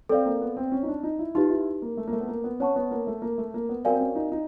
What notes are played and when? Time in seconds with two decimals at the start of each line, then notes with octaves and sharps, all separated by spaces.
0.09 C4 A4 D5 F5
0.26 A#3
0.41 B3
0.57 C4
0.72 C#4
0.83 D#4
0.88 D4
1.03 D#4
1.19 E4
1.35 D#4 F4 G4 B4
1.50 E4
1.82 A#3
1.97 A3
2.08 A#3
2.13 A3
2.21 B3
2.28 A#3
2.44 B3
2.60 C#4 C#5 F#5 A5 C#6
2.76 B3
2.91 A#3
3.07 A3
3.22 A#3
3.38 A3
3.54 A#3
3.69 B3
3.85 C4 F#4 A#4 D5 F5 G#5
3.96 C4
4.00 C#4
4.15 D#4
4.32 D#4